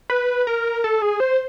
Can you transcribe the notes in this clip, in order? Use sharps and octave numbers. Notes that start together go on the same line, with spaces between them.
B4
A#4
A4
G#4
C5